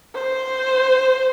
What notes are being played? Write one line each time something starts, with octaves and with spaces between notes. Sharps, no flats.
C5